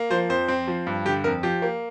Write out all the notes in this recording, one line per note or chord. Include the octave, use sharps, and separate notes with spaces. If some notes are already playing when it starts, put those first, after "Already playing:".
Already playing: A#3
F3 C5
F2 C5
C4
F3
G2
D3 G4
F2 A#4
F3 G4
A#3